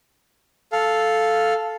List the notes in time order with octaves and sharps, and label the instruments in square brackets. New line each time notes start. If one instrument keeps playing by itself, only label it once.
[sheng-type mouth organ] A4 F5